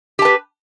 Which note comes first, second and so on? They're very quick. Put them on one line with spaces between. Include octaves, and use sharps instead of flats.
G4 A5 B4